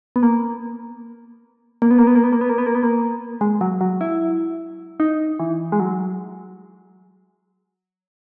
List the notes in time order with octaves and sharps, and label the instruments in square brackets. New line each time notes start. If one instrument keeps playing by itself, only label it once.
[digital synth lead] B3
A#3
A#3
B3
A#3
B3
A#3
B3
A#3
B3
A#3
B3
A#3
B3
A#3
G#3
F#3
F#3
E4
D#4
E3
G#3
F#3